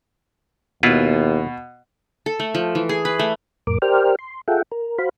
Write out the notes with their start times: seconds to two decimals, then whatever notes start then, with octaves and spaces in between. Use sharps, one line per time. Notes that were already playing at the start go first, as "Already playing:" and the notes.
0.83 D#2 B2 E4 F4 B4
2.26 A4
2.40 A3
2.55 F3
2.75 E3
2.89 G#4
3.05 B4
3.19 A3
3.67 F2 A2 A#4 D6
3.82 G4 A#4 C5 D5 G5 F6
4.19 C6
4.48 F4 G#4 A4 E5 F#5 G5
4.72 A#4
4.99 F#4 C5 F5 B5